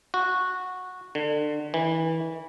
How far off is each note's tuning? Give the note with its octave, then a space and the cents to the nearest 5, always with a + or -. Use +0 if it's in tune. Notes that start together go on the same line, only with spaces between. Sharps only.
F#4 -10
D3 +30
E3 -25